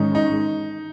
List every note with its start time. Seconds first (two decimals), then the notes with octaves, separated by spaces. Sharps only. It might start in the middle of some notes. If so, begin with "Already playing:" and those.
Already playing: G#2 D#3 G#3 C#4 D#4
0.15 D#4